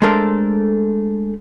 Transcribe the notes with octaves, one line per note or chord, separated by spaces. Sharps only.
G#3 A3 D4 A4 A#4 C5